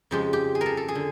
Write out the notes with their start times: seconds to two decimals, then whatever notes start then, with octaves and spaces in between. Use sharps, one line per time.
0.11 F2 C#3 F3 G#3 G4
0.33 G4
0.55 G#4
0.61 A#4
0.66 A4
0.77 A4
0.88 G#4
0.95 D3